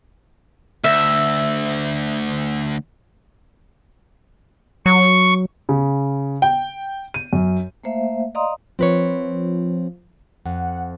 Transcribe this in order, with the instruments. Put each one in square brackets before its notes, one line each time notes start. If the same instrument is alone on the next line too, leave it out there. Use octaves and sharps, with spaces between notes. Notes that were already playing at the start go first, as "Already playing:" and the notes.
[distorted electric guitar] D2 [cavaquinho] E5
[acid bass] F#3 [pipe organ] C#6
[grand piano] C#3
G5
D#7
F#2
[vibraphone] A3 A#3 C5 E5 F5
D5 D#5 F5 A#5 C6 D#6
[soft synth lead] F3 [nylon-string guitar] C4 B4 C#5
[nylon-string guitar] F2 [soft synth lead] F#5